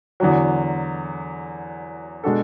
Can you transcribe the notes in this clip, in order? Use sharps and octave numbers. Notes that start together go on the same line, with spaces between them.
E2 D3 F#3
B2 G#3 D4 F#4 A4